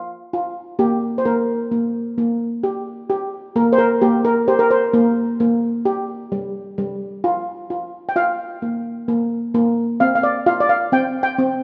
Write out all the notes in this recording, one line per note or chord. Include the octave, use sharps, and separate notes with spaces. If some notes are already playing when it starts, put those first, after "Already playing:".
Already playing: F4
F4
A#3 G4
C5
A#3 A#4
A#3
A#3
G4
G4
A#3 A#4
C5
A#4
A#3 G4
A#4
G4 C5
A#4
C5
A#3
A#3
G4
G3
G3
F4
F4
G5
F4 F5
A#3
A#3
A#3
C4 F5
F5
D5
F4 F5
D5
F5
C4 G5
G5
C4